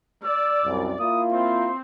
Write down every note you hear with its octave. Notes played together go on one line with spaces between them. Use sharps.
D5 E6
C2 F#2
A#3 E4 F4 D#6
C4 C6